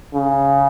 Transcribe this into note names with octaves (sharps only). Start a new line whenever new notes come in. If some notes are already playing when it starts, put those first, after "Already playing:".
C#3